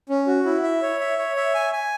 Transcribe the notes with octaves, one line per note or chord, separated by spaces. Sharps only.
C#4
F#4
E4
E5
C#5
E5
C#5
E5
G#5
G#5